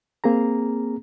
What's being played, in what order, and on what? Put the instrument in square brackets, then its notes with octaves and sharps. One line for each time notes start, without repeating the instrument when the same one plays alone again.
[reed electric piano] A#3 C4 G#4 A#5